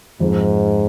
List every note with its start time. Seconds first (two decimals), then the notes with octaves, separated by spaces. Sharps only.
0.20 F2 G#2